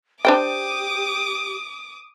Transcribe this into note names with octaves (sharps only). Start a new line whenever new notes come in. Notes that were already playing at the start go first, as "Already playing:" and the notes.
D4 G4 C5 G5 D6 D#6